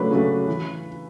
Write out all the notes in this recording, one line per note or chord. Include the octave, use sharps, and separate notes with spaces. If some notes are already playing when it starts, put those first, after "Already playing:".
Already playing: C#3 F#3 A3 D4 B4
C#3 F#3 A3 D4
E3